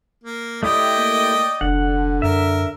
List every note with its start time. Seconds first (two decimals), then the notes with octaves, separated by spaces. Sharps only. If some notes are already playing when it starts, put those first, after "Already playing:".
0.23 A#3
0.63 A3 E4 G4 D5 D#5 G5
0.98 A#3
1.61 F1 D3 F#5
2.22 F#2 A#4 E5